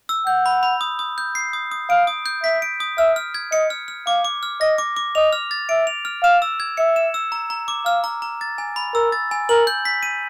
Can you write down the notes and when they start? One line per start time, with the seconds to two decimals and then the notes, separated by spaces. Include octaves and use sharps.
0.09 E6
0.27 F#5 G6
0.46 B5
0.63 B5
0.81 D#6
0.99 D#6
1.18 G6
1.35 C7
1.53 D#6
1.71 D#6
1.89 F5 D7
2.07 D#6
2.26 G6
2.43 E5 B6
2.62 D7
2.80 D#6
2.98 E5 F6
3.16 F6
3.34 G#6
3.52 D#5 C#7
3.70 F6
3.88 F6
4.07 F5 D6
4.25 D6
4.43 F6
4.61 D#5 A#6
4.78 D6
4.97 D6
5.15 D#5 F7
5.33 F6
5.51 A6
5.69 E5 D7
5.87 F7
6.05 F6
6.23 F5 E7
6.42 E6
6.60 G#6
6.77 E5 C#7
6.96 E7
7.14 E6
7.32 A#5
7.50 A#5
7.68 D6
7.86 F5 F6
8.04 A#5
8.22 A#5
8.41 A6
8.58 G#5
8.76 B5
8.94 A#4 E6
9.12 A6
9.31 G#5
9.49 A#4 F#7
9.67 G6
9.85 B6
10.03 D#7